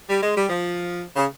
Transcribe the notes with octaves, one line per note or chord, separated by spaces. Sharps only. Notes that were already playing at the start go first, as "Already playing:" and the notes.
G3
G#3
G3
F3
C#3